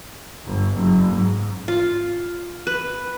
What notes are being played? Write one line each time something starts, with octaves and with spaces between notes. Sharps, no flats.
G1
F#1
G#2
F4
B4